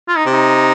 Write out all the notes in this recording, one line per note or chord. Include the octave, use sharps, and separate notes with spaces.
F4
D#4
C3
D#4